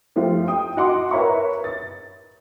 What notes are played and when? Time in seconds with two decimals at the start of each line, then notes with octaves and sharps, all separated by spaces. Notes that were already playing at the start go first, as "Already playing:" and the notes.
0.16 F3 A3 F4 G4
0.48 G5 D#6
0.77 F#4 D#5 F#5 C6 D6
1.11 A#4 B4 C#5 E5 A#5 C#6
1.64 A6